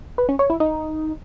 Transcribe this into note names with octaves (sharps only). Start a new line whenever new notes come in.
B4
C#4
C#5
E4
D#4